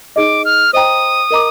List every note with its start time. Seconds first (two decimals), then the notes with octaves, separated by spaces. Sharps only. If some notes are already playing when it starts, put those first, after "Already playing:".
0.16 D#4 G#4 D#5 D6
0.45 F6
0.73 C5 D#5 G5 A#5 D#6
1.31 A#4 D#5 A#5 D6